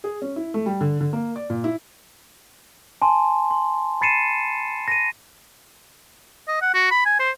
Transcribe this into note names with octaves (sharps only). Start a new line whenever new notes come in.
G#4
C#4
E4
A3
G3
D3
D3
A#3
D5
A#2
E4
G#5 A5 C6
C6
B5 A6 C7 C#7 D#7 E7
A#6 D#7
D#5
F#5
F#4
B5
G#5
C5